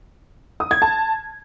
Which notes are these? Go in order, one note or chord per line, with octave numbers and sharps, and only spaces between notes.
D#6
G#6
A5